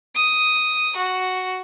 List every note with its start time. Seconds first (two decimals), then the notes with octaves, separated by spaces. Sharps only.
0.15 D#6
0.97 F#4